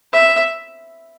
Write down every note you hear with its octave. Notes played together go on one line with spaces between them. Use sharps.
E5